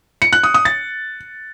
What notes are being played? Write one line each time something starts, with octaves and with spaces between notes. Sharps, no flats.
C#7
F#6
D#6
D#6
A6